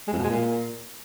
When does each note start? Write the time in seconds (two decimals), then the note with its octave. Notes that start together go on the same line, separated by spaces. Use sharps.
0.07 G#3
0.13 F2
0.19 B2
0.24 G#3
0.30 A#2